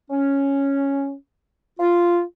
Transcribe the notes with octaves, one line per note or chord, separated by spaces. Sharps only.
C#4
F4